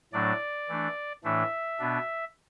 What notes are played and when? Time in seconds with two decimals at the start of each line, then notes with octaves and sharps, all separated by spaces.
0.13 A2 F#3 A3 D4 D5
0.69 E3 A3 D4
1.24 A2 E3 A3 D4 E5
1.79 B2 B3 D4